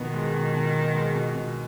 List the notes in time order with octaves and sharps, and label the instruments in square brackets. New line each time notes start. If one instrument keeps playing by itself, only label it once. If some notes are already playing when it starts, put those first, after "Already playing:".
Already playing: [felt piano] B2 B3 [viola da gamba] D#3
[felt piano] G#3
B2
B2
B3
G#3
B2
B2